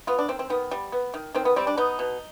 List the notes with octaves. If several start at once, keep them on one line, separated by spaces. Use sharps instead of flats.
B3 F4
D4
D#3 C4
C4
D#3 B3
G3
B3
D#3
D#3 C4
B3
G3 C4
D4
B3 D#4
B2